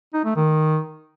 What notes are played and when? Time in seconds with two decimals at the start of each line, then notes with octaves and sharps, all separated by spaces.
0.14 D#4
0.25 A3
0.36 D#3